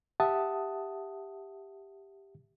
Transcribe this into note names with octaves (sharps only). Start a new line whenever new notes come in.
G4 E5 F#5 A5 D#6